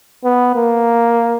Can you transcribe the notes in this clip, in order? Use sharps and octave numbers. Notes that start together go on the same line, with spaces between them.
B3
A#3